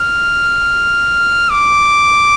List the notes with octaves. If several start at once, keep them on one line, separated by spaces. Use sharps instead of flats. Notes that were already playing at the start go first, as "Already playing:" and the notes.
Already playing: F6
D6